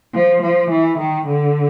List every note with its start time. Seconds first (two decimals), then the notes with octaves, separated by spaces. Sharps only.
0.14 F3
0.42 F3
0.71 E3
0.99 D#3
1.27 D3